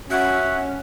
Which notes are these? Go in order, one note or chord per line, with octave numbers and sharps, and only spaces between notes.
C#4 F#4 E5 F#5